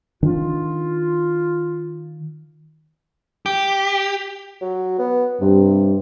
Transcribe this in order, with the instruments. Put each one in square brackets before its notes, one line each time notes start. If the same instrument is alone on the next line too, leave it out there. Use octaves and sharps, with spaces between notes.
[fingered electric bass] D#3 D4 [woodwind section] F4
[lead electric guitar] G4
[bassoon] F#3
B3
[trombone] G2 [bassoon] C3